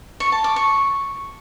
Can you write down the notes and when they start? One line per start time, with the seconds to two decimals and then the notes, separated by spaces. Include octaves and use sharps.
0.20 C#6
0.32 A5
0.44 D6
0.56 C#6